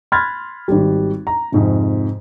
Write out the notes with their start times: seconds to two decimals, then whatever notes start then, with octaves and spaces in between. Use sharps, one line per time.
0.12 B5 C6 F6 F#6 G#6 A6
0.68 G#1 G3
1.27 A#5
1.52 F2 G#2 C3